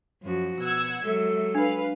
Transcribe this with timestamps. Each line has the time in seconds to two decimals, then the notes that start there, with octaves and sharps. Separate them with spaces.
0.23 F#2 F3 F#4
0.59 B2 F#5 E6 G#6
1.04 F#3 G#3 A4 E5
1.55 D4 B4 F5